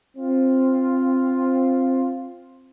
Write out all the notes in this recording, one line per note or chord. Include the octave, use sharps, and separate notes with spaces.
C4 F4